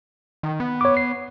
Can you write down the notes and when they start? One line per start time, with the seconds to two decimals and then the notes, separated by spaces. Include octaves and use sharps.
0.43 D#3
0.60 B3
0.81 C#5 D6
0.97 C7